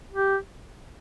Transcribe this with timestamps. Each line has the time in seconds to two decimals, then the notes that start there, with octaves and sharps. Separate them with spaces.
0.12 G4